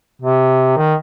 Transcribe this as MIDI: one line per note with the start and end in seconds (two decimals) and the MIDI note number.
0.22 0.72 48
0.77 0.95 51